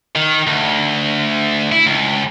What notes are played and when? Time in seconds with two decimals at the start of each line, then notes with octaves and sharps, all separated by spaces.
0.16 D#3
0.47 D2
1.72 E4
1.86 C#2